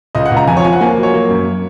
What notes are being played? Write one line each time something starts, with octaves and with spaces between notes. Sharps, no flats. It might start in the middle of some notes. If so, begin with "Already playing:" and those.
C#2 D#5
F#5
C#2 A#5
F2 G#5
C#5
F3 G#5
F#5
A#3 G#5
F#3
C#5
A#3
F#2